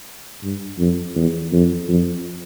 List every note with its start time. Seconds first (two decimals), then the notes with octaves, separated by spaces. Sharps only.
0.43 G2
0.79 F2
1.15 E2
1.53 F2
1.88 F2